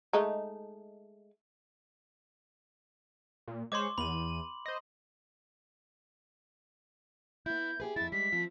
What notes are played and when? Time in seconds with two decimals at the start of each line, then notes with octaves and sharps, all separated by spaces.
0.13 G#3 A3 D#4
3.48 A#2
3.72 G#3 C5 C#5 C6 D6
3.98 E2 B5 D#7 F#7
4.66 C5 D#5
7.46 B3 E4 G6
7.80 G4 G#4 B4
7.96 F2 E4 A6
8.12 G3 G#3 B6
8.32 F3 C4 F4